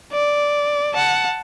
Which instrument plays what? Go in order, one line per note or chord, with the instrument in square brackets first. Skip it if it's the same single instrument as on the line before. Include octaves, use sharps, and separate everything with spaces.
[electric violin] D5
F#5 A5